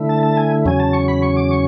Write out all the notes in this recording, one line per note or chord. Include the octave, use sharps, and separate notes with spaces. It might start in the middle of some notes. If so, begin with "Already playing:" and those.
Already playing: D3 A3 E4
A5
A5
G#5
E2 C#3 F#3 C#4 G#5
A5
C#6
B5
C#6
D6
C#6